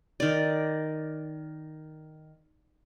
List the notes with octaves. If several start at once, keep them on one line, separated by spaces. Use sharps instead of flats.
D#3 D5